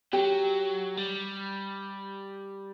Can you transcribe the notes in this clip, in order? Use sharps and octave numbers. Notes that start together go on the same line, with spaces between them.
F#3 G4
G3